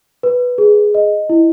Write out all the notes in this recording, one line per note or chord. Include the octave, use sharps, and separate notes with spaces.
B4
G#4
D#5
E4